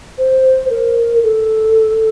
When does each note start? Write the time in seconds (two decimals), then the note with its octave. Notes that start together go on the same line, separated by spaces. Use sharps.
0.18 C5
0.70 A#4
1.23 A4